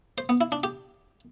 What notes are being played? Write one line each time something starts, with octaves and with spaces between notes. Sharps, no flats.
C5
B3
E4
D4
G4